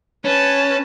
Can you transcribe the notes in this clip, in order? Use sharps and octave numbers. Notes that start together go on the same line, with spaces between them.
C#4 B4 A5